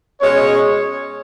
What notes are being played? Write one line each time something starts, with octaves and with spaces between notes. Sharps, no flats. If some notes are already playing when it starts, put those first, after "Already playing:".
B2 G#3 C#4 C#5